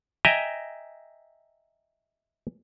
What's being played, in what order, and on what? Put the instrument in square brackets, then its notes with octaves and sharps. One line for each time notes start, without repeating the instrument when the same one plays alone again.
[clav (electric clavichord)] D#5 E5 G5 G#5 A#5